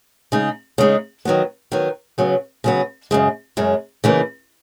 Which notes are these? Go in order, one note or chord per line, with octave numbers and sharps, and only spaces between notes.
C#3 G#3 D#4
C#3 G#3 D#4
D#3 F#3 B3
D#3 F#3 B3
C#3 F#3 B3
C#3 F#3 B3
F#2 C#3 G#3
F#2 C#3 G#3
C#3 E3 A#3 D#4